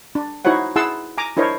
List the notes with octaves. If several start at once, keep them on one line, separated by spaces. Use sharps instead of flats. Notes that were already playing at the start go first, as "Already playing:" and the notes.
D4
D#4 E4 F#4 C5 C#5 F#5
E4 G#4 F#5 A5 C6 E6
G#5 A#5 D6
D4 E4 A#4 C5 C#5 D#5